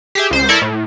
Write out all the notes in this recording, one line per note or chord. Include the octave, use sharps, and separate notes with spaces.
G4 G#4 E5
C#2 C5
E4 A4 A#4 D5 E5
A2